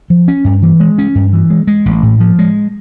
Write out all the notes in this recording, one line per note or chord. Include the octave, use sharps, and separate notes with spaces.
F3
C#4
G2
E3
G#3
C#4
G2
E3
G#3
G#3
A1
A2
F3
G#3